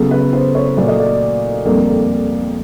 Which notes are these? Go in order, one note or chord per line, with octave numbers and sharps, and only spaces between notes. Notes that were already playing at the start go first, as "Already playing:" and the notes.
Already playing: C#3 F#3 B3 A4
B4
C5
C#5
A#2 F#3 A3 D5
D#5
D5
F2 D3 G3 A#3